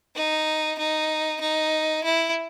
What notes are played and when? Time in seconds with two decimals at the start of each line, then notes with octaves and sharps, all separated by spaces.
0.15 D#4
0.78 D#4
1.41 D#4
2.04 E4